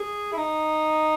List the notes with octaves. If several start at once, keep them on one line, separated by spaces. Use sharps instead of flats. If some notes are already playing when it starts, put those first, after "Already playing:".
Already playing: G#4
E4
D#4